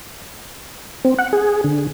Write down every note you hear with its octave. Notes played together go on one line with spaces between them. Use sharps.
C4
F#5
G#4
D3